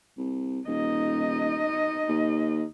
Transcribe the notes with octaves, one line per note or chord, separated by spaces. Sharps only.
C2
D#1 D#4 D#5
D#2